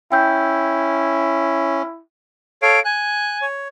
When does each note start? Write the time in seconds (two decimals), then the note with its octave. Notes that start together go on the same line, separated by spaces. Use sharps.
0.12 C#4 E4 G5 E6 G6
2.62 A4 C#5 F5 D7
2.85 G#5 F#6
3.42 C#5